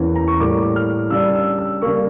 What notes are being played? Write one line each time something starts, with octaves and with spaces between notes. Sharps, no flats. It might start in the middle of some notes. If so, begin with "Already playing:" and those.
Already playing: E2 E3 A#3 C#4
A#5
C#6
A2 G3 A#3 D6
F6
C#3 G3 D4 E6
E6
E6
C#3 G3 A#3 C#6